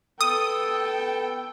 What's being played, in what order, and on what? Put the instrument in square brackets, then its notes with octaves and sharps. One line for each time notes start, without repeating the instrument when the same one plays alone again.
[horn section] B3 A4 [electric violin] G5 [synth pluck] D#6